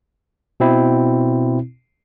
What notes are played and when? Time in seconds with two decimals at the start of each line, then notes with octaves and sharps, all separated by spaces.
0.60 B2 C4 E4